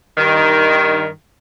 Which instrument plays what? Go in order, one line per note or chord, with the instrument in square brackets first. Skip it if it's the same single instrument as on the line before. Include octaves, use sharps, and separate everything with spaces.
[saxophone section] G2 D#3